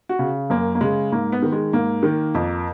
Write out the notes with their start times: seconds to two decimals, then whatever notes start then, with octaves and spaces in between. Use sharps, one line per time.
0.09 F#4
0.19 C#3
0.50 F#2 A#3
0.75 A#3
0.81 C#3 G#3
1.12 G#2 A#3
1.32 B3
1.43 D#3
1.52 G#3
1.73 G#2 A#3
2.03 D#3
2.35 F2